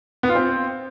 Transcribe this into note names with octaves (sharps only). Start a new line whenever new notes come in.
B3
F4
C4